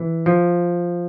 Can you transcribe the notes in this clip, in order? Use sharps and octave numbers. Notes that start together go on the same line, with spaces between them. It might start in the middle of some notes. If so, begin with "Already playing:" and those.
Already playing: E3
F3